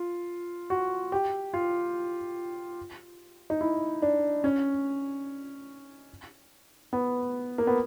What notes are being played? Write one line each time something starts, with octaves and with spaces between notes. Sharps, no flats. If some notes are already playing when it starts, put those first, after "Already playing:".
Already playing: F4
F#4
G4
F4
D#4
E4
D4
C#4
B3
A#3
B3